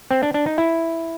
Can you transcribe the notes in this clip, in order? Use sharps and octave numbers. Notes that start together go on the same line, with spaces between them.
C4
D4
D4
D#4
E4